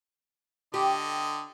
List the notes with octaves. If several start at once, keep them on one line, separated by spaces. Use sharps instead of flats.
D3 G4 D#5